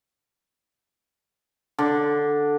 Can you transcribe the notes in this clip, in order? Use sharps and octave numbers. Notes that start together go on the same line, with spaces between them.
D3